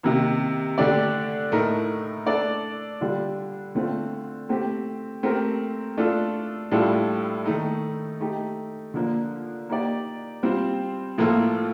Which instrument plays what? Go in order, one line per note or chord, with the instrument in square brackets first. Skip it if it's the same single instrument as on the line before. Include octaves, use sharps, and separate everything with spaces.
[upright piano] C3 D#3 A#3 D#4
D3 A3 D4 G4 D5
A2 A3 D#4 A#4
A3 D4 A4 D5
D3 G3 D4 F4
D3 A3 C4 F4
A3 C4 G4
A3 C4 G4 A#4
A3 D4 F4 A4
A2 G3 D4 F4 A4
D#3 A3 D#4
A3 D#4 G4
D3 F3 A#3 D4
A#3 D#4 G4 D5
G3 C4 F4 C5
A2 F3 A#3 F4 A4